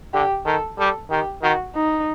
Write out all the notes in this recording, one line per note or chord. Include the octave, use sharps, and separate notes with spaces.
D3 G4
D#3 A4
G3 A4
D#3 G4
D#3 F#4
D#4